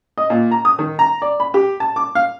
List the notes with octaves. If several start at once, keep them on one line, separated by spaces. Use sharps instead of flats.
D#5
A#2
A#5
D#6
D#3
A#5
D5
B5
G4
A5
D6
F5